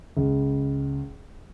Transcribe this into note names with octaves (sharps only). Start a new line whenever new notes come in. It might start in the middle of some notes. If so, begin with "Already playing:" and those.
C#2